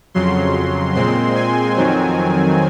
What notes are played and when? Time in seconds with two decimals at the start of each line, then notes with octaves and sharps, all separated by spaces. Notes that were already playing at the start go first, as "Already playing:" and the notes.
0.14 F2 C#3 F#3 C6
0.95 A#2 G#3 C4 C6
1.35 G#5
1.76 F2 D#3 F#3 C4